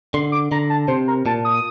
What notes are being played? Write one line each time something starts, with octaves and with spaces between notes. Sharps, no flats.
D3 C6
D6
D3 A#5
A5
C3 C5
A#4
A#2 A5
D#6